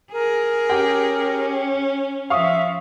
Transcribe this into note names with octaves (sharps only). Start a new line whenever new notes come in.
G#4 A#4
C#4 G4 G5
F3 E5 F5 C#6 D#6